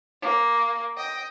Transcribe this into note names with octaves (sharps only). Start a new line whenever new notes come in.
A#3
D#5 G5